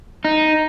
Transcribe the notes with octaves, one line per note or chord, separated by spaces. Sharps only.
D#4